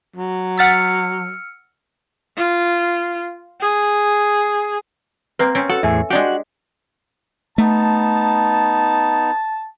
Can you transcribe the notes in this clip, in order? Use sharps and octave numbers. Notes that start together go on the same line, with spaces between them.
F#3
F#5 E6 F6 A6 B6 C#7
F4
G#4
A#3 C4 B4
C4 C#4
F#4 A4
E2 A2 G#4 E5 G#5
G#3 D4 F#4 G4
A3 B3 D#4 A5